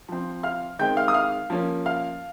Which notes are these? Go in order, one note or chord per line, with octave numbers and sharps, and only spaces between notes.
F3 C4
F5 F6
D#3 G#3 C4 G5 G6
F5 F6
D#6
F5 F6
F3 A#3 C#4
F5 F6